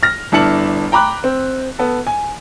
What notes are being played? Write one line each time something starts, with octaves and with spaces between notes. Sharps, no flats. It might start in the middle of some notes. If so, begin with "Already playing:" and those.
F6 A#6
G1 D4 E4 A5 C#7 F#7
G5 A#5 B5 D6 F#6
C4
B3 A4
G#5